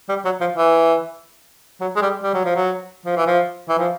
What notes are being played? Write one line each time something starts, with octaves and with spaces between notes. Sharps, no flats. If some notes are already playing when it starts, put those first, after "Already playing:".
G3
F#3
F3
E3
F#3
G#3
G3
G3
F#3
F3
F#3
F3
E3
F3
E3
F3